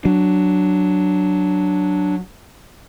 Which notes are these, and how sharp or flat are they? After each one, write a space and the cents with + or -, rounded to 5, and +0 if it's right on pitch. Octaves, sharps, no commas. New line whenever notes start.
F#3 +0 D4 +0